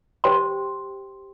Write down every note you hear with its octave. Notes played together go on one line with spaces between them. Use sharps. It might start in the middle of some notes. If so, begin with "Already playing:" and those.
G4 C5 G5 C6